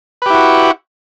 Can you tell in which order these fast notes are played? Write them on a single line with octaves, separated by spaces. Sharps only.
B4 G4 E4 F#4